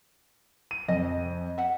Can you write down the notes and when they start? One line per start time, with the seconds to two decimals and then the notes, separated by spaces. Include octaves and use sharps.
0.71 D#7
0.88 F2 D#5
1.58 E5 F#5